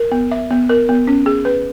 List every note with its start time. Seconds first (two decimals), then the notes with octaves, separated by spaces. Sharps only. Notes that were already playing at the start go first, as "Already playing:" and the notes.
Already playing: A#4
0.12 B3
0.31 E5
0.51 B3
0.69 A#4
0.89 B3
1.07 C#4
1.26 G#4
1.45 B4